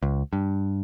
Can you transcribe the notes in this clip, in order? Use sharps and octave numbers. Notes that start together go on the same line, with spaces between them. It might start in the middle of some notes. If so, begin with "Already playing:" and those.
C#2
G2